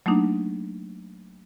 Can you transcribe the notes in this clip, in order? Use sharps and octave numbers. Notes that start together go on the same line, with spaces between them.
F#3 A3 A#3 D4 D#4